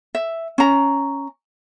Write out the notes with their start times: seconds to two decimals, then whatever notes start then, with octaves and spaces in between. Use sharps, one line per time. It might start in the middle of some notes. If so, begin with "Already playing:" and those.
0.15 E5
0.58 C#4 A#5